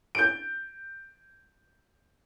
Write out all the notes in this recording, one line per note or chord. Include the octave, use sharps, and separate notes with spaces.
G6 D7